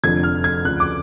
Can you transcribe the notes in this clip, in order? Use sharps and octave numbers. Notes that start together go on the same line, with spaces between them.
F1 F2 D3 F3 G#6
F6
G#6
D2 C#3 F3 F#6
D6